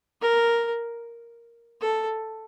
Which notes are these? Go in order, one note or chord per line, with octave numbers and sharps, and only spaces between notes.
A#4
A4